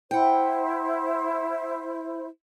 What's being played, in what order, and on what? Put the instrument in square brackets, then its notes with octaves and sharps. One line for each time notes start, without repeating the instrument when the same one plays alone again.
[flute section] E4 C5 [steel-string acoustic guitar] F#5 G5